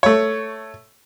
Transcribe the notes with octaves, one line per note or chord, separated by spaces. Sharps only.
A3 C#5